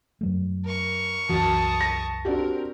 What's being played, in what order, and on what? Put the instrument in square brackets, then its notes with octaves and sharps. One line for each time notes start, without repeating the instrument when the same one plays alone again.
[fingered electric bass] F#2 F#3 A3
[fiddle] A#4 C#6
[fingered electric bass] C2 F#2 E3 [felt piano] F#4 [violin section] A5 D#6
[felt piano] A#6
[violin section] C4 A#4 [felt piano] D4 F#4 G4